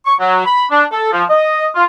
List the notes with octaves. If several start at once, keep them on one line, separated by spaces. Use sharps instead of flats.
C#6
F#3
B5
D4
A4
F3
D#5
F4